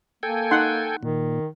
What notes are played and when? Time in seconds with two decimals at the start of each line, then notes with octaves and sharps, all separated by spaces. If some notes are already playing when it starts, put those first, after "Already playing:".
0.23 A#3 A4 G5 G#5
0.51 D#4 F#5 C6
1.03 A#2 D#3